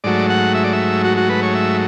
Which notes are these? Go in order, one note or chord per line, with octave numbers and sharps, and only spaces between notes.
G#2 F#3 A3 D5
F#5
E5
D5
E5
F#4
F#4
B4
C#5
E5